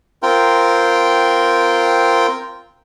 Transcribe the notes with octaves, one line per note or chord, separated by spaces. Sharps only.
C4 F4 A#4 G5